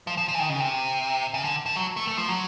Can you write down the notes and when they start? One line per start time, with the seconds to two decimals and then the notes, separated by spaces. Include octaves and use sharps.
0.07 F3
0.17 F3
0.28 F3
0.34 E3
0.39 D#3
0.49 C#3
0.60 C3
1.34 C#3
1.44 D3
1.66 F3
1.76 F#3
1.97 A3
2.08 A3
2.17 F3
2.28 F#3